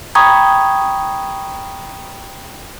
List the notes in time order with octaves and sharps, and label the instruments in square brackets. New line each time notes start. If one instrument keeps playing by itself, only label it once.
[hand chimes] G5 A#5 B5 C#6 D#6 G#6